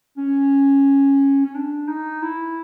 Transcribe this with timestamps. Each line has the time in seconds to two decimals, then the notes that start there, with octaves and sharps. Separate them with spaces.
0.17 C#4
1.46 C#4
1.54 D4
1.88 D#4
2.22 E4